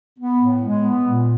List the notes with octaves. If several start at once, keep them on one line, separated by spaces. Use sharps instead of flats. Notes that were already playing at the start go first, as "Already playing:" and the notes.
B3
A2
G#3
B3
A#2